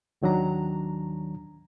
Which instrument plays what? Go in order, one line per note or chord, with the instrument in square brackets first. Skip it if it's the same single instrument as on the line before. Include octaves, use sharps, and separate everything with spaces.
[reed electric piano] D#2 D#3 F#3 D4 A#5